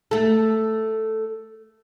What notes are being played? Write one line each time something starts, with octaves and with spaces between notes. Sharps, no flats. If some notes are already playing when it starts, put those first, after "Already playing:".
A3 A4